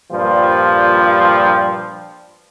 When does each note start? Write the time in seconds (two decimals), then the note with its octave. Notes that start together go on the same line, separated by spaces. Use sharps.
0.12 G2 A#2 F3 G3